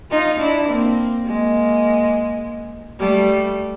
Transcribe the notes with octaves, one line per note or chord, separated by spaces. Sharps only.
D#4 F4
D4 E4
A#3 C4
G#3 A#3
G3 A3